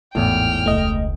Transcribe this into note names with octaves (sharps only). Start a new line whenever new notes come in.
G#1 E2 A2 G5 F6
E1 C#2 A3 D#5